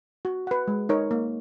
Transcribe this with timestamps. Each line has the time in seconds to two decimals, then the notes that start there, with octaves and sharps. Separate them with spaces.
0.25 F#4
0.47 B4 F#5
0.68 G#3
0.89 D#4 A#4 C#5
1.11 A#3